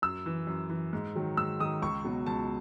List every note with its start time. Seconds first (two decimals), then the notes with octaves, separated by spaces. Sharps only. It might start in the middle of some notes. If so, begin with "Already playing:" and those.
0.02 F#2 E6
0.26 E3
0.47 F#2
0.70 E3
0.93 G#2
1.16 D#3 F#3
1.37 G#2 E6
1.59 D#3 F#3 D#6
1.82 C#2 C#6
2.04 B2 F#3
2.26 C#2 A5